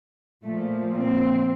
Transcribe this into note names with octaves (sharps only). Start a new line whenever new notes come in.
A#2 F3 A3
C4